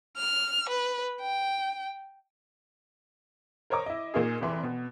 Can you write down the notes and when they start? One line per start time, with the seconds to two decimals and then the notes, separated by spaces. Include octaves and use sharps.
0.16 F6
0.69 B4
1.21 G5
3.70 A#4 C5 C#5 D#5 A#5 D6
3.86 E4 D#5
4.14 A#2 A#3 D#4 F4 G#4
4.41 F1 E3 C6
4.63 B2